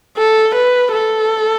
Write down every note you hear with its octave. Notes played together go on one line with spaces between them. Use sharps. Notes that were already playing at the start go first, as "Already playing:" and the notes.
A4
B4
A4